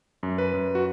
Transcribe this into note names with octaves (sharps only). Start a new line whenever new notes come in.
F#2
B4
F#2
F#4